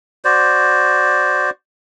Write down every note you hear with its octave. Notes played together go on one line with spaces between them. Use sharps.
F#4 C5 D5